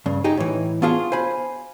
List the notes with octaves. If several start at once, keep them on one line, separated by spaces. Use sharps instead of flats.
G2 C#3
D#4 G4 G#4
A2 E3
B3 D4 F4 F#4 G#4
C5 G#5 B5